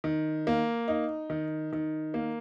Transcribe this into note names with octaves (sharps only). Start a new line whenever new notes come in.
D#3
A#3
D#4
D#3
D#3
A#3